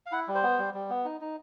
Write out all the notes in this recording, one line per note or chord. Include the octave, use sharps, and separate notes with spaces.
F5
E4 F#5
G3
C5
B3
G3
G3
B3
D#4
D#4